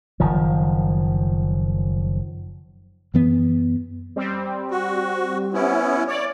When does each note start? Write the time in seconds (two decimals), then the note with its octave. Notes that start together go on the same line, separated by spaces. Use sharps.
0.20 F#1 D#3 F3
3.14 F#2 E3 B3
4.16 G3 C4
4.71 F#4
5.54 B3 C#4 E4
6.08 C#5 D5